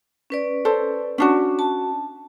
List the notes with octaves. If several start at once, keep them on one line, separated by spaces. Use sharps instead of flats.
C#4 B4 D5
A4 C5
C#4 D4 F#4
A5